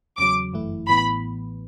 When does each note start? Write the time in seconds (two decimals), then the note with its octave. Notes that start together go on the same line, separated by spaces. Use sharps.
0.18 E2 C#3 F#3 D6
0.53 G1 F#2 E3 A3 E4
0.88 A1 A2 E3 B3 B5